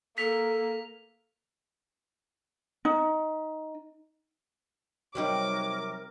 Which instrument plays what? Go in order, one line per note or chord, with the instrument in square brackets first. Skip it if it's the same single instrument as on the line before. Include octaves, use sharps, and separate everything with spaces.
[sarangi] A#3 [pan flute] A4 [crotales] B6 F7
[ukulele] D#4
[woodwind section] C3 A#4 [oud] F#3 G3 D#4 [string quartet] D6